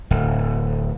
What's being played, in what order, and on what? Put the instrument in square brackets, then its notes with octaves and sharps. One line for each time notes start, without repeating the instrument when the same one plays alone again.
[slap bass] D1